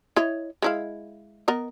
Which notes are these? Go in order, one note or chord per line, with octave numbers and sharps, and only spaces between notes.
E4 C#5 D#5
G#3 E4 F5
B3 A#4 D#5